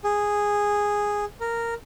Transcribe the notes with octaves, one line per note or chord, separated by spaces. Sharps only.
G#4
A#4